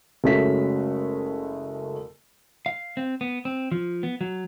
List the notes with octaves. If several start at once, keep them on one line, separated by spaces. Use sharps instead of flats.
F#1 G#3 A3 C#4 F#4 B6
F5
C4
B3
C4
F3
B3
F#3